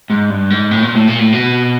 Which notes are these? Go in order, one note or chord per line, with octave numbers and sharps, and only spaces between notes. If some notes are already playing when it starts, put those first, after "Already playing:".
G#2
G2
G#2
A2
A#2
A2
A#2
A2
B2